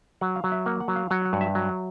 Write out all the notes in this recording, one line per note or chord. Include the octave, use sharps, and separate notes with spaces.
F#3 F#5
F5
F#3
E5
A#3 F#5
F#5
F#3
F5
F#3 F#5
F#5
G2
E5
F#3